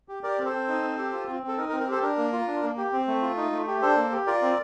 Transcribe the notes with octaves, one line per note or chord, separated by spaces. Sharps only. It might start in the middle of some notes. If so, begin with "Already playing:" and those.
G4
G4 A#4 D5
C4
A4 C5
C4
D#4
C4
G4
F4
C4
C4
A4
D#4 A#4
A#4
C4
A#4
G4 A4 C5
D4 A#4
A#3
F4
D4
A#3
G4
C4
A3
F4
D#4
A3
G4
D4 A4 C5
A#3
G4
F4 A#4 D5
C4